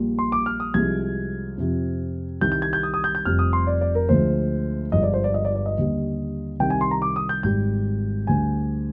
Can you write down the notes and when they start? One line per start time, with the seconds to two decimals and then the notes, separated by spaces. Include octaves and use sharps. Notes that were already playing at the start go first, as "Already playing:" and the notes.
Already playing: A#1 A#2 G3
0.19 C6
0.32 D6
0.46 F6
0.60 D#6
0.74 C2 C3 F3 G#3 G#6
1.58 F2 C3 F3
2.41 C2 C3 D#3 G3 G6
2.52 G6
2.62 G#6
2.73 G6
2.83 D#6
2.94 D#6
3.04 G6
3.15 G6
3.25 F1 F2 C3 G3 F6
3.39 D#6
3.53 C6
3.67 D5
3.81 D5
3.95 A#4
4.09 D2 D3 F3 G#3 C5
4.92 G1 G2 F3 G#3 D#5
5.03 D5
5.14 C5
5.24 D5
5.34 D#5
5.45 D5
5.55 D5
5.66 D#5
5.76 D#2 D3 G3
6.60 C2 C3 D#3 G3 G5
6.70 G#5
6.81 C6
6.91 A#5
7.02 D6
7.16 D#6
7.29 G6
7.43 G#1 G#2 G3 G6
8.27 D2 D3 G3 G#5